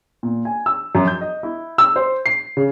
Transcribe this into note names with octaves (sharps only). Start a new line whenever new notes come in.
A#2
G#5
E6
F#2
G6
D#5
E4
E6
C5
C7
C#3